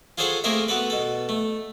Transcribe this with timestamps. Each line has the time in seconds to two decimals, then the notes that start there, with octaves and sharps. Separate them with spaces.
0.18 F4 G#4 A4 C5 C#5 F#5
0.44 A3 A#3 C4 G#4 A#4 E5
0.68 B3 F#4 A4 B4
0.90 B2 A4
1.29 A3